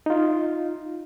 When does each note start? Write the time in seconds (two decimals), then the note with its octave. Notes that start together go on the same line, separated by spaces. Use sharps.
0.06 D#4 F4